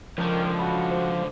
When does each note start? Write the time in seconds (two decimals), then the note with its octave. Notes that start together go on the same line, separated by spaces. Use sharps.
0.18 C#2 D3 D#3 F3 A#4 C#5 G5
0.59 F#4 B5
0.91 C5